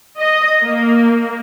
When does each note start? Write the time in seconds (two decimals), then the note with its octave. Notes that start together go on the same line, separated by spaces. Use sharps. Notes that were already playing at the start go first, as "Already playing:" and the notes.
0.18 D#5
0.62 A#3